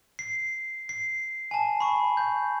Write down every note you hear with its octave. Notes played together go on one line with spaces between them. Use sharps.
C7
C7
G#5 A5
B5 C#6
G6